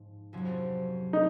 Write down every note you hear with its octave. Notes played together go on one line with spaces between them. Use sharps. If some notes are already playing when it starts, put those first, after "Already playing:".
Already playing: G#2 F3
F2 C3 F#3 C#4
D#4